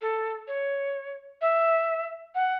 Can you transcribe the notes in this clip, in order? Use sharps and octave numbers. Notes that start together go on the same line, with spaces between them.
A4
C#5
E5
F#5